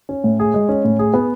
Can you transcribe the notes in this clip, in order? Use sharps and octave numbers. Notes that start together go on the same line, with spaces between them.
C#4
A2
G#4
G#3
C#4
A2
G#4
B3